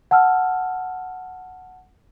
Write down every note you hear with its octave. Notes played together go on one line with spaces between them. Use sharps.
F#5 A5 E6 F6